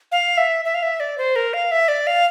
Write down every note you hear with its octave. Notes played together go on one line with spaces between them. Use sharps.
F5
E5
E5
F5
E5
D5
C5
A#4
F5
E5
D5
F5